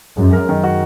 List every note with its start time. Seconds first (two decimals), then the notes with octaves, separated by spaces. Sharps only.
0.17 F#2 G#3
0.33 A#4
0.49 D#3
0.64 F#4